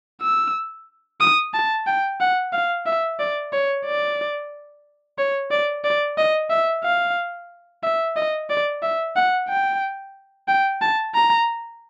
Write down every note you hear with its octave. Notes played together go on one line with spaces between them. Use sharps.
E6
D#6
A5
G5
F#5
F5
E5
D5
C#5
D5
C#5
D5
D5
D#5
E5
F5
E5
D#5
D5
E5
F#5
G5
G5
A5
A#5